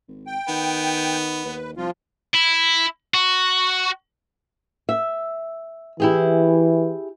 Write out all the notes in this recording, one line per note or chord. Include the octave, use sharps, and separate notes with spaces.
G#1
G5
D#3 B3
D#2 B4
C2 F3 F4
E4
F#4
E5
E3 E4 G4 G#4